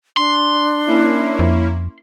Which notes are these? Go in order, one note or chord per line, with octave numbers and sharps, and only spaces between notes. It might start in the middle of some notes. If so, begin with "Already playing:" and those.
D4 C6
A#3 C#4 E4
F2